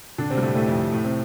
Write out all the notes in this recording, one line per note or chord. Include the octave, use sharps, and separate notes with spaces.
D3 D4
C3 C4
G3
A2 A3
A2 A3
F2 F3
A2 A3
C3 C4